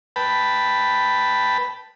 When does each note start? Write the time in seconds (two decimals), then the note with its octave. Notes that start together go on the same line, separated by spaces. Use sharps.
0.16 B4 G5 A5 B5